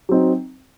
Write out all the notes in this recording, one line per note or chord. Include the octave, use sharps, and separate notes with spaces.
F#3 C4 D#4